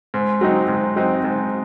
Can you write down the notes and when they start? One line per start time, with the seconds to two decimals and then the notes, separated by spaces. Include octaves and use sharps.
0.14 G#2
0.41 F#3 C4 D#4
0.68 G#2
0.96 F#3 C4 D#4
1.24 G#2